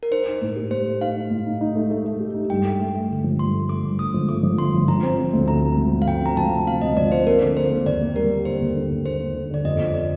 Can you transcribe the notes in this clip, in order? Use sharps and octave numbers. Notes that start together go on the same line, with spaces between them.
A#4
D#4 C5
D#4
A2
G4
A2 C5
A3
D#4 F5
D#4
A2
D#4
D#4
A3
A3
A3
G4
D#4
G2 G5
A3
A3
A3
G1
F3
G2 C6
A3
A3 D6
G2
G1 D#6
F3
A3 D6
F3
G1 C6
F3
F3 A#5
C4
C4
D2
D2 A#5
C4
F3
F3
F5
F3 G5
C4 A#5
F3 A5
C3
C4 F5
D2 D#5
F3 D5
C4 C5
A#3 A#4
D3
A#3 C5
A#3
D#2 D5
A#3
G3 A#4
A#3
D3 C5
D#2
D3
D#2
A#3 C5
A#3
D3
D3 D5
F2 D#5
F2
D5